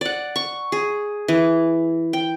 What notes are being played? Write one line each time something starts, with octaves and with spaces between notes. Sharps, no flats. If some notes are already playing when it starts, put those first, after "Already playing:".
D5 F#5
C#6
G#4
E3
G5